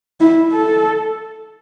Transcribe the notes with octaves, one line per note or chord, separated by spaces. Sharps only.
E4
A4